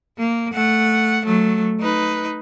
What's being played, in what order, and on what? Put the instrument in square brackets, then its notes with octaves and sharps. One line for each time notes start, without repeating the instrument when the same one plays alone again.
[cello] A#3
A3 F#5
F#3 A3
D#4 B4